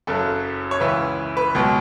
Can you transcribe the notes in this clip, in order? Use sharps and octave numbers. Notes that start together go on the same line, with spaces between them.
F#1 F#2 C#3 F#3 A4
C#5
C#2 C#3 E3 B4
B4
C#2 B2 F#3